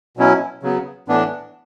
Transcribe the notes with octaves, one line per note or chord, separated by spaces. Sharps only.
B2 F#3 C#4 E4
C#3 F#3 B3
A2 E3 B3 D4